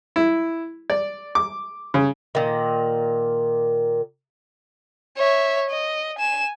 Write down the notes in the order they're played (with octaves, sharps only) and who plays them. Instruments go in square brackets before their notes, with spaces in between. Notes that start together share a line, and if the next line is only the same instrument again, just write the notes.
[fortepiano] E4
D5
D6
C#3
[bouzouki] A#2 D#3
[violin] C#5 E5
D#5
G#5 E7